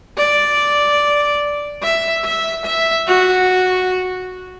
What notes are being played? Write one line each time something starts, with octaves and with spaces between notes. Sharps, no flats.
D5
E5
E5
E5
F#4